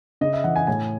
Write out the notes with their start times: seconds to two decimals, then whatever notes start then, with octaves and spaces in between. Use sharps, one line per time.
0.21 C#3 D#5
0.33 E5
0.44 E3 F#5
0.56 G#5
0.67 A2 G#5